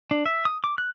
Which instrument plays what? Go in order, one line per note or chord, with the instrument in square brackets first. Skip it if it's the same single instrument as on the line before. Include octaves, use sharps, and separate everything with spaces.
[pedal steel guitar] D4
E5
D#6
D6
F#6